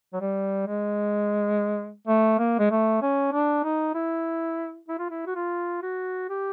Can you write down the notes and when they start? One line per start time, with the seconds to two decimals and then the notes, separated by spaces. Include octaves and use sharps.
0.13 F#3
0.21 G3
0.67 G#3
2.08 A3
2.39 A#3
2.59 G#3
2.71 A3
3.02 C#4
3.33 D4
3.64 D#4
3.95 E4
4.89 E4
4.99 F4
5.10 E4
5.27 F#4
5.35 F4
5.82 F#4
6.29 G4